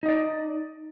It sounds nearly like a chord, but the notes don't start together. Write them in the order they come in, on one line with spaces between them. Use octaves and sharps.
D#4 D#5 D5